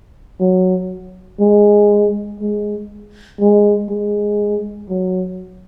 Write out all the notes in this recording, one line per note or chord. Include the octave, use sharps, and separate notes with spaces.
F#3
G#3
G#3
G#3
G#3
F#3